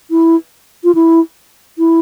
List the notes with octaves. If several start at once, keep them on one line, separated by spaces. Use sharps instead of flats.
E4
F4
E4
E4